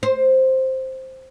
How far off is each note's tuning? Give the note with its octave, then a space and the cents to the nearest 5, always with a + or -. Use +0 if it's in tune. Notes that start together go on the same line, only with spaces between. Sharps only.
C5 +5